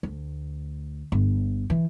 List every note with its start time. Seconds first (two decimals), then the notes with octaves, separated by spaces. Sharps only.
0.03 D2
1.12 G1
1.70 E3